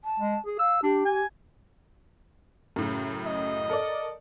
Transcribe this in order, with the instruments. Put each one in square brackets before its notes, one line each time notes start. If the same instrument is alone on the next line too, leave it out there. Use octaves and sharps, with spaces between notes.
[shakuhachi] A5
[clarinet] G#3
G#4
[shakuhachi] F5 [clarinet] E6
[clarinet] D4 [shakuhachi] G4
[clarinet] G#5
[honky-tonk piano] F#2 A2 C#3
[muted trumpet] D#5
[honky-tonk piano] A4 A#4 D5